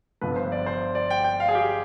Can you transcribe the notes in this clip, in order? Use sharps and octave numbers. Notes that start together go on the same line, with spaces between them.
G1 G2 F3 B3 B4
C5
D5
C5
D5
G5
G5
F5
G#4
G4